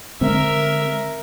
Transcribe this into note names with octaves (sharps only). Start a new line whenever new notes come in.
D3 G#3 C4 A#4 E5